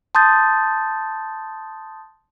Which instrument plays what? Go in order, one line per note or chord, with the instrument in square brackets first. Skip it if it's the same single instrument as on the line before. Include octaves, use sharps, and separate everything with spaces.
[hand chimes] A5 C6 D#6 G6 A6